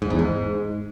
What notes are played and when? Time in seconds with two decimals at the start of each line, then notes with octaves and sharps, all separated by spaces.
0.02 G#2
0.10 E2
0.19 G#2